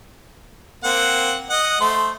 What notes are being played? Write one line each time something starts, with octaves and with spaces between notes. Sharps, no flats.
A#3 C4 F#5
D#5 F#5
A3 C5